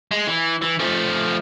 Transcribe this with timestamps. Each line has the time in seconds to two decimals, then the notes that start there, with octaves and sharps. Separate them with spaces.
0.11 G#3
0.27 E3
0.62 E3
0.79 F3 A3